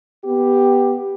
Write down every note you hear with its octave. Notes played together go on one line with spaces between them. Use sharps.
B3 G4